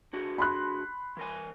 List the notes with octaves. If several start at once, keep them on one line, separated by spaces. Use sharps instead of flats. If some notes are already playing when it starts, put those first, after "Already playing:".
D3 F#4 G#4
B5 C6 F#6
E3 A#4 G#5